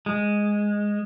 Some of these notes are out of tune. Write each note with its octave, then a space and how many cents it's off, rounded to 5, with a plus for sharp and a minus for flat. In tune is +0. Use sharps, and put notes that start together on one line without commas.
G#3 -5